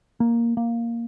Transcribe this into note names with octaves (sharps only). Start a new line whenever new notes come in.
A#3
A#3